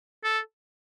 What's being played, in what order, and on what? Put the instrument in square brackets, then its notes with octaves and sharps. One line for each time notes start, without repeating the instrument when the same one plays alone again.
[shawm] A4